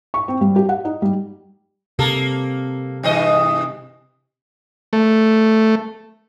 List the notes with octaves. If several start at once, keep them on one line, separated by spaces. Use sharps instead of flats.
C#6
C4
G3
G4
F#5
D#4
G3
C3 A#3 A4
G2 E3 D#5
A3